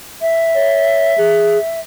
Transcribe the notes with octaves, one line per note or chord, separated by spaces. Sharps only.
E5
C#5
G#4